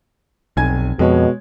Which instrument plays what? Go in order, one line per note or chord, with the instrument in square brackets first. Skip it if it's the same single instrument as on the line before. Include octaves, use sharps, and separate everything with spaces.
[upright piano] F1 G#5 G#6 [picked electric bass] B1
[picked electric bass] F2 [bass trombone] B2 [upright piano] G#3 C#5